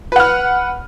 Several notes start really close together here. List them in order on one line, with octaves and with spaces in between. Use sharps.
B4 F#5 F6